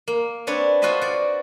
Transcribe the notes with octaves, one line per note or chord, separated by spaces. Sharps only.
A#3
C4 D4 B4 C#5
F4 F#4 B4 C5 D#5 E5
F#4 D5